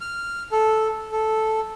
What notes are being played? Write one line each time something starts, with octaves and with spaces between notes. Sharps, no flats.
F6
A4
A4